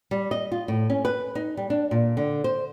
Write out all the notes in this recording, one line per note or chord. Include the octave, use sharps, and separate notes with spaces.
G3
D#5
F4
A2
C#4
B4
D#4
G3
D4
A#2
D3
C5